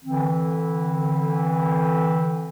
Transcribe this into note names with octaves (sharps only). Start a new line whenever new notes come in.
D3 E3 C4